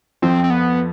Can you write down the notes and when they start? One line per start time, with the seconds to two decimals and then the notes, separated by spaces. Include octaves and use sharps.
0.22 F2 F3 C4
0.44 C4
0.50 B3